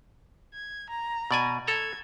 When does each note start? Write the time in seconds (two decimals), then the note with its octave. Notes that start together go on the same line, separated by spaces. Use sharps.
0.54 G#6
0.89 A#5
1.31 B2 D5 G#5
1.68 A4 A#5 G#6